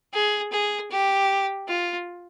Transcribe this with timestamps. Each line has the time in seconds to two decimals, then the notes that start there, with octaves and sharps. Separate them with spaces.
0.14 G#4
0.52 G#4
0.91 G4
1.68 F4